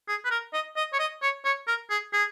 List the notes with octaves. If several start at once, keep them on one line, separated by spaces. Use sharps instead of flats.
G#4
B4
A#4
D#5
D#5
C#5
D#5
C#5
C#5
A#4
G#4
G#4